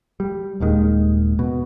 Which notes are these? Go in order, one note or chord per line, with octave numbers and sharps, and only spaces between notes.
G3
D#1 D#2 D#3 G#3
B2